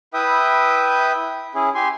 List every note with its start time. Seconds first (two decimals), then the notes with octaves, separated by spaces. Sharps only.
0.14 E4 B4 E5 G5 D#6
1.55 C#4 E4 G#4
1.75 G4 G#5 C6